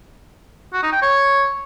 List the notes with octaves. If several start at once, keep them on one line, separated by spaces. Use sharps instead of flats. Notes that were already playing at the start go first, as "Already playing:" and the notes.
F#4
D#4
G5
C#5